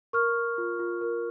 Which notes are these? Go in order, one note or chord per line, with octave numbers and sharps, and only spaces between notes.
A#4 C#6 F6
A#4
F4
F4
A#4